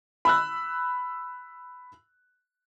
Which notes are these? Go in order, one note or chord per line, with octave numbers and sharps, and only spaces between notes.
B5 E6 F#6